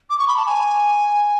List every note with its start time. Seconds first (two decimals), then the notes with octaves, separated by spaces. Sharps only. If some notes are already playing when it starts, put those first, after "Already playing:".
0.10 D6
0.18 C#6
0.27 B5
0.36 A5
0.46 G#5